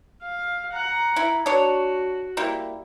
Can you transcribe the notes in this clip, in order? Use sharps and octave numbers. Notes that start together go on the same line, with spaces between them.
F5
F#5 A#5
E4
D4 F#4 C#5
G3 A#3 E4